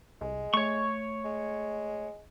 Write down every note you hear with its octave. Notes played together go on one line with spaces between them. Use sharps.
C2 G#3
A3 C#5 C#6
G#3